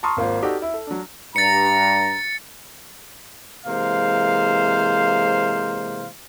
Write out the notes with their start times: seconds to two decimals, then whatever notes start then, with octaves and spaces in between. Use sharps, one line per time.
0.03 A5 A#5 C6 C#6 D#6 F6
0.17 G#1 A#3 F4 C5 F5
0.42 D#4 F#4 G4 A4 D5
0.62 E4
0.74 A4
0.87 F#3 D4
1.36 G2 A#5 A6 C#7
3.66 C3 E3 G#3 A#3 C5 F5